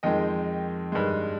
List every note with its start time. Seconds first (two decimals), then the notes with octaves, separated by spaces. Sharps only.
0.03 F2 D#3 G#3 D#5 G5
0.92 G2 D#3 G#3